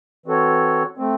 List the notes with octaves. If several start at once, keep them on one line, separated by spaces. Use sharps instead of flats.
E3 C4 F#4 A4 C#5
A3 C4